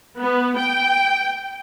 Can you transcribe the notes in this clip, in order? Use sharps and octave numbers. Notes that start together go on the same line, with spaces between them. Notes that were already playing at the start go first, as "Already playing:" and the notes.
B3
G5